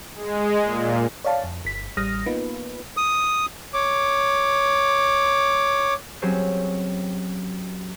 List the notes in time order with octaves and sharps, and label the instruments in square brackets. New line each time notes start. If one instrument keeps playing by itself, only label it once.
[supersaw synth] G#3
A#2
[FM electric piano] C#5 D5 F5 A5
F2
G1 B6
A1 G3 D#6 F6 A#6
A#3 B3 D#4 F4 B4
[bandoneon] D#6
[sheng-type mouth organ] C#5 D6
[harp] F#3 C4 C#4 G4 G#4 C#5